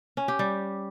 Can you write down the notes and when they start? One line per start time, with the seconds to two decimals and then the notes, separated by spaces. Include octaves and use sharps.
0.17 C#4
0.28 G4
0.39 G3